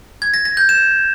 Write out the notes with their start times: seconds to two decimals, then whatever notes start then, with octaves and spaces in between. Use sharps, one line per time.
0.22 G#6
0.34 A#6
0.45 A#6
0.57 G6
0.69 E7